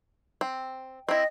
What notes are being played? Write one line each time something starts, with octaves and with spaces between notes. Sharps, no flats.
C4
C4 E4 D#5